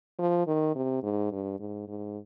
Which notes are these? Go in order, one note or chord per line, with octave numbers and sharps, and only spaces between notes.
F3
D#3
C3
G#2
G2
G#2
G#2